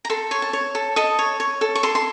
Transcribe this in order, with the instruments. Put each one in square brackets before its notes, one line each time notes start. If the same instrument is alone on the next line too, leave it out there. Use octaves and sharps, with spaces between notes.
[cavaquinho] A#5
A4 C6
C#5 C6
A5
C#5
A4
A4 D#5
C#5
C#5
A4
C#6
A4 C6
C6